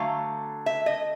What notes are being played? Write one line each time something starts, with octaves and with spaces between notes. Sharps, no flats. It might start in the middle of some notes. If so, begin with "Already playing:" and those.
Already playing: D3 F#3 A3 F5
E5
D#5